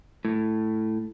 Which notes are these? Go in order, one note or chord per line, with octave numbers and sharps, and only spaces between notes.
A2